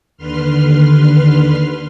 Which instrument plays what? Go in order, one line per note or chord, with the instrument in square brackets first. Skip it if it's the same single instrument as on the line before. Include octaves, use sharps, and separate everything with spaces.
[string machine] D#2 D3 B4 C6 F6